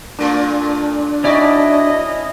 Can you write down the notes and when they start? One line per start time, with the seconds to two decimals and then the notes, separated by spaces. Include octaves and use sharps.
0.19 A#2 A3 D4 F4
1.24 C#4 D#4 E4 F#4 D5 D#5